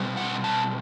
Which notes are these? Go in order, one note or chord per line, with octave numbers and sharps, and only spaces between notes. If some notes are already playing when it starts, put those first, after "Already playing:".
Already playing: B2 G3 C4
F#5
A5